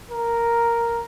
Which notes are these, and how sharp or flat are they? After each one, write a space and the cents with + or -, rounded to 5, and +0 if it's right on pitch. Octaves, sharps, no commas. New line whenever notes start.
A#4 +0